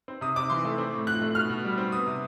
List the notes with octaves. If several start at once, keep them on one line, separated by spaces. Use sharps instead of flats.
C4
C3 D#6
C3 D6
E3 C6
A3
C4
A2
F3 F#6
A3
B2 F6
B2
G3
C4
B3 D#6
C3